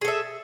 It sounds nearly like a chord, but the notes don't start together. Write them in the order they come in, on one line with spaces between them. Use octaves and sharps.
G#4 A4 E5